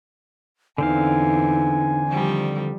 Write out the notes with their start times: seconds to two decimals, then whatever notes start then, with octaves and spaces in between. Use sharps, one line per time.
0.78 E2 D3 C4 D#4 F5 G#5
2.09 D#3 F3 G3